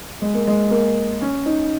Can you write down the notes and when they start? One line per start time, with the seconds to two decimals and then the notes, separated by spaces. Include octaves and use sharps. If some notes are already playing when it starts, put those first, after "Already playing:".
0.22 G#3
0.34 A#3
0.47 G#3
0.71 A#3
1.22 C#4
1.46 D#4